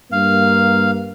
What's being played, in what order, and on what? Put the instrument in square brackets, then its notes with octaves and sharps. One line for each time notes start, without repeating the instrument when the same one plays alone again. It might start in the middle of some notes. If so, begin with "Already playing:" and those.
[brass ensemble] G2 A#3 [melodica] F5